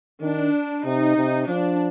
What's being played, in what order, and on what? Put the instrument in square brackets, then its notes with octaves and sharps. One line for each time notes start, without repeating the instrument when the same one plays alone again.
[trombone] D#3 [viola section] D4
[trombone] C3 [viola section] D#4
[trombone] C3
[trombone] F3 [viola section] D4